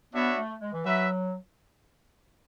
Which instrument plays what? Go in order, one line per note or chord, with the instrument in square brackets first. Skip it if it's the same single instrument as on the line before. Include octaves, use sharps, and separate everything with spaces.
[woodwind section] B3 [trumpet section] D4 F#4 C#5 E5
[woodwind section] A3
G#3
E3
[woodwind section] F#3 [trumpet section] F#4 B4 E5